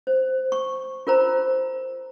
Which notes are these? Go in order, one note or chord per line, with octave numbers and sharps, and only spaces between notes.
C5
C#6
F4 A#4 C5 A#5